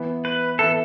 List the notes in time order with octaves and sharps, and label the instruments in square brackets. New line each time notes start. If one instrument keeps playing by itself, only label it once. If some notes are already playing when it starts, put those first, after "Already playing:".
Already playing: [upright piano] E3 B3 E4
[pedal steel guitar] B4
[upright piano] E3 B3 E4 [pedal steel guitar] A4